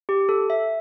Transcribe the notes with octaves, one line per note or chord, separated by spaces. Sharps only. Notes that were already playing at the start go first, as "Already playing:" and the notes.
G4
A4
E5